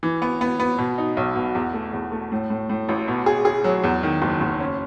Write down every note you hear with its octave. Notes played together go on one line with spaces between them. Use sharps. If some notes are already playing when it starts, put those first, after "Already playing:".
E3
B3
B3
B3
B2
D#4
B1
B2
E2
A3
E2
A3
A2
A2
A2
A1
B2
G#4
G#4
F#3
E2
D#3
F#1
F#1
C#4